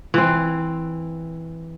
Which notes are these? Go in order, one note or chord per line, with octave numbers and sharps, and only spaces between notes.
E3 C4